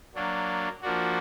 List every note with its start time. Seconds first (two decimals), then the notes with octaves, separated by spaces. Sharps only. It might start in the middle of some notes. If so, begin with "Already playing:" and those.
0.15 F#3 A#3 D4
0.82 F3 A#3 D4 F#4